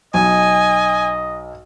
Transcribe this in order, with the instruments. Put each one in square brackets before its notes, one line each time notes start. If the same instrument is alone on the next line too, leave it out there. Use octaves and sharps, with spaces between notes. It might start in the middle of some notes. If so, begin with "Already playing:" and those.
[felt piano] B1 [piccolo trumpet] D#5 [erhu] G#5